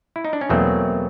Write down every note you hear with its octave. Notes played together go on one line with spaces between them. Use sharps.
E4
D#4
D4
C#4
E2 B2 F#3 A3 A#3 C4